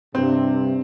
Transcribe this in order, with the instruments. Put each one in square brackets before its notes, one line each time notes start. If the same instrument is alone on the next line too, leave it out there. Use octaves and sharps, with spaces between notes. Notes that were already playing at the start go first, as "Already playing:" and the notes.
[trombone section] G2 C3 [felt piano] C4